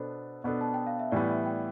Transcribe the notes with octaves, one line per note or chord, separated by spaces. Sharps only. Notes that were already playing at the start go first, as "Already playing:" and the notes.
Already playing: B2 B3 D4 A4 C5
B2 B3 D4 A4
A5
G5
F5
E5
A2 E3 G3 B3 D5
E5
G5